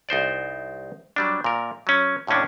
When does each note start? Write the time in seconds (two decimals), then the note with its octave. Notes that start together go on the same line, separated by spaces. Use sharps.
0.09 C2 D#4 C5 D5
1.16 F#3 G3 D4
1.44 A#2 A#4
1.87 F#3 C#4
2.27 D#2 A2 C3 C#4 D4